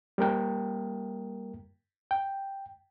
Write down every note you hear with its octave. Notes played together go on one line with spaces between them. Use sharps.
G3 A#3 A#4 G5
G5